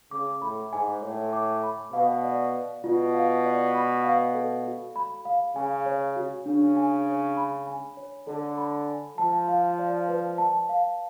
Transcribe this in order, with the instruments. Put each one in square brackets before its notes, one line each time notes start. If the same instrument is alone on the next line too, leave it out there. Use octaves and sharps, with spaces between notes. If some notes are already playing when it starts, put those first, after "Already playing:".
[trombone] C#3 [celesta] D6
[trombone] A2 [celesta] B5
[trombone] G#2 [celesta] G#5
[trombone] A2 [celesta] C#5
[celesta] D6
B5
[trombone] B2 [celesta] F5
[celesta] D5
B4
[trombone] B2 [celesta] F4
[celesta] F5
D5
B5
F5
A4
F#4
B5
F5
[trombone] C#3 [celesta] G#5
[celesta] C#5
F#4
[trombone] C#3 [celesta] D4
[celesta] G#5
C#5
B5
G#5
C#5
[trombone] D3 [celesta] A4
[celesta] B5
G#5
[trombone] F3 [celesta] A5
[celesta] F5
D5
B4
A5
F5